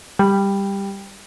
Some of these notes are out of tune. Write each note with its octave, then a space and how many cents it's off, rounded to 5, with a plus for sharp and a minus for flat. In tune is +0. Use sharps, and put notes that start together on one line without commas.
G3 +10